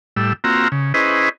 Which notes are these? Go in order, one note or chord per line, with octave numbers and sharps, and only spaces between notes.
A2 G3 E6
A#3 C4 F4 F#4 A#5 E6
C#3
C#4 E4 G#4 B4 C5 D#5